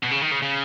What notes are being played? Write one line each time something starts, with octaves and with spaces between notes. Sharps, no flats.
B2
C#3
D#3
C#3
C#3